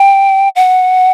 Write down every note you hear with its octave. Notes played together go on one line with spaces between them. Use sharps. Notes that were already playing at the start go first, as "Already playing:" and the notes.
Already playing: G5
F#5